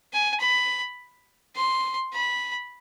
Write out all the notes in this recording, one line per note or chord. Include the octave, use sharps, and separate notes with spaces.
G#5
B5
C6
B5